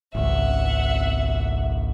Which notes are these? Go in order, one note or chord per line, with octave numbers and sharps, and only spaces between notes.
G#1 C#2 E5 F#5